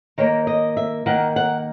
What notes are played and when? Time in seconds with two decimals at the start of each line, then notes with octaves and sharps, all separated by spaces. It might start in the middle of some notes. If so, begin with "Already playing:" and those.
0.18 D#3 A#3 C#5
0.47 D#5
0.77 E5
1.06 D#3 A#3 F#5
1.36 F#5